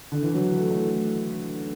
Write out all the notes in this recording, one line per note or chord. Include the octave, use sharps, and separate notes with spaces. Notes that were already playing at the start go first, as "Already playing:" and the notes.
D3
E3
F#3
A3
A3